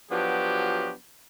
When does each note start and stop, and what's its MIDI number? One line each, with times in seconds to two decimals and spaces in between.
0.11 0.93 53
0.11 0.93 54
0.11 0.93 59
0.11 0.93 62
0.11 0.93 66
0.11 0.93 67